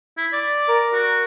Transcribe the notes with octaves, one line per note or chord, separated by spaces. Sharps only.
E4
D5
A#4
F#4